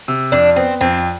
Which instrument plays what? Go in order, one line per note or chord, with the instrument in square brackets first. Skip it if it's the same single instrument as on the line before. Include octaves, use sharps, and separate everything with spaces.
[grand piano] C3
[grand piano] F2 [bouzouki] D4
[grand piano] B3 [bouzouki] C4
[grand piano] F2 [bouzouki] C4